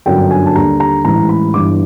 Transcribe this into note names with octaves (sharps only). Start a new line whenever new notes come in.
G1 F#2 D3 F#3 G5
G#5
A5
D#2 D3 G3 A#5
A#5
A1 G#2 E3 G3 A#5
B5
G1 G2 E3 D6